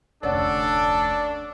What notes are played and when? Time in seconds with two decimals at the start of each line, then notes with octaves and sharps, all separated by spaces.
0.23 F1 D2 C#4 D4 A4 D5 F#5